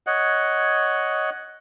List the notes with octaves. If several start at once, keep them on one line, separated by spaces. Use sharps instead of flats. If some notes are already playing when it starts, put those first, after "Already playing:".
C#5 D#5 F#5